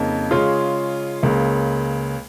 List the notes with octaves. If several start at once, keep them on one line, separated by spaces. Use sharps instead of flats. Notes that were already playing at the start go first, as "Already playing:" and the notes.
Already playing: F2 C#3 A#3 D#4
C#3 G#3 C#4 F4
C#2 C#3 A#3